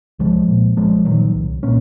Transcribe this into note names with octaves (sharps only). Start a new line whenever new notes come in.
C2 F3 G#3
A#2
C2 F3 G#3
A#2 D#3 F#3
C2
A#2 A#3 C#4